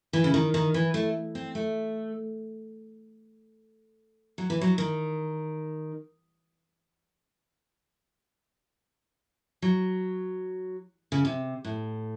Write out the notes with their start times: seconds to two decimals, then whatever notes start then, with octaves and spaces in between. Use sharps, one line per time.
0.13 E3
0.24 C#3
0.34 D#3
0.54 D#3
0.74 E3
0.94 A3
1.35 C4
1.55 A3
4.38 F#3
4.50 E3
4.61 F#3
4.78 D#3
9.62 F#3
11.12 C#3
11.25 C3
11.65 A2